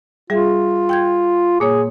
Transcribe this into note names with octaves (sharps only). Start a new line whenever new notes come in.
G3 F4 G#4 E5
G5 G6 G#6
A#2 A#3 G#4 C#5